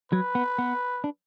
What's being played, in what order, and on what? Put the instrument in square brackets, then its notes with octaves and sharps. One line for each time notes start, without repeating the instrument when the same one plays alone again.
[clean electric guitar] F#3 [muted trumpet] B4
[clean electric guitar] B3
B3
D4